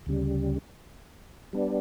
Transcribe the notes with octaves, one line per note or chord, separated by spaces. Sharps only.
D2 C#3 G3
G3 B3 D4